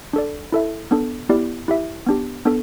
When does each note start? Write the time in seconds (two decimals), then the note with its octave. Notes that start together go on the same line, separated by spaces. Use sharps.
0.13 D4 A4 D5
0.52 E4 A4 E5
0.91 B3 D4 A4
1.29 B3 E4 G4 D5
1.68 E4 G4 E5
2.06 B3 D4 G4
2.45 B3 D4 A4